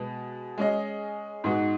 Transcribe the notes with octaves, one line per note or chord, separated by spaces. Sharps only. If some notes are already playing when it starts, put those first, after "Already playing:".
Already playing: B2 G#3 B3
G#3 C#4 G#4 D#5
G#2 G#3 B3 D#4 F#4